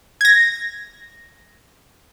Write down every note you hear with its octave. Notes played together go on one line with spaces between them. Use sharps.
G#6 A#6